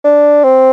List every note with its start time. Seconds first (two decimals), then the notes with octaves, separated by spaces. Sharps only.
0.04 D4
0.44 C4